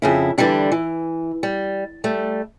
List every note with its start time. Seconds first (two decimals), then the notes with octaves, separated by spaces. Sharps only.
0.02 F2 C#3 E4
0.38 D3 E3 F#3 G3 D4
0.72 E3
1.43 G3
2.04 G3 A3